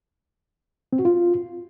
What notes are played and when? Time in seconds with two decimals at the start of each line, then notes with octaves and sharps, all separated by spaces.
0.93 C4
0.99 F#4
1.05 F4